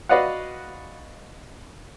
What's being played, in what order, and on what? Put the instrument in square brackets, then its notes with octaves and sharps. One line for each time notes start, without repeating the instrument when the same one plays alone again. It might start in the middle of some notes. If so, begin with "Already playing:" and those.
[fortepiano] F#4 B4 D5 D#5 F5 F#5